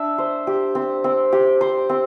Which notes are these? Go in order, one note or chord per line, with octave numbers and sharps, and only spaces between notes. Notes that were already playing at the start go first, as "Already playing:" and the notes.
Already playing: D4 E5
C5
G4
C4
C4
G4
C5
C4